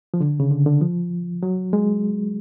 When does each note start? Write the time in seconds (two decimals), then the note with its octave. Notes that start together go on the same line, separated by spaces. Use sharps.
0.14 F3
0.20 D3
0.40 C#3
0.51 D3
0.66 D3
0.81 F3
1.43 F#3
1.73 G#3